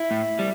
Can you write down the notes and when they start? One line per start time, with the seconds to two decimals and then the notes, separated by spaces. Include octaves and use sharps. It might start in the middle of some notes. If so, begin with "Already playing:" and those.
Already playing: E4
0.11 A2
0.39 G3